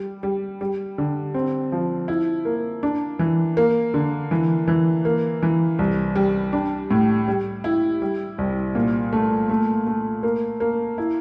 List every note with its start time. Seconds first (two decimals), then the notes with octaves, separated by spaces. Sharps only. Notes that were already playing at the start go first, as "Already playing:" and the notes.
Already playing: G3
0.23 G3
0.61 G3
0.98 D3
1.34 C4
1.72 F3
2.08 E4
2.45 A#3
2.83 D4
3.19 E3
3.57 A#3
3.94 D3
4.31 E3
4.68 E3
5.05 A#3
5.42 E3
5.79 C2
6.16 G3
6.53 D4
6.91 A2
7.28 G3
7.64 E4
8.02 G3
8.38 C2
8.75 A#2
9.13 A3
9.50 A3
9.87 A3
10.23 A#3
10.60 A#3
10.98 E4